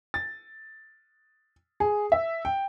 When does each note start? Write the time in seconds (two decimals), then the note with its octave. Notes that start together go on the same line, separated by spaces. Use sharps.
0.14 A6
1.80 G#4
2.12 E5
2.45 G5